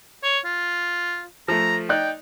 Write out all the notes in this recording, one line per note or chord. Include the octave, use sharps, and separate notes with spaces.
C#5
F4
F3 A3 A#5
D#4 D5 G5 F#6